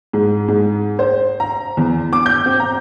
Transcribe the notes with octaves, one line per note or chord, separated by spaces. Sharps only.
G#2
G#2
C5
A#5
E2
D6
G6
C4
A#5